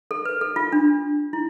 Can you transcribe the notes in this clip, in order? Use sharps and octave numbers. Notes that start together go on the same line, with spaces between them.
A4
B4
A4
F4
D4
E4